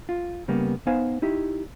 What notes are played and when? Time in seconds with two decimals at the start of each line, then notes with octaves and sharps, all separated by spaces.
0.09 F4
0.48 C#3 G3 A#3 B3
0.87 B3 D#4 C5 F5 G#5
1.22 D#4 E4 G4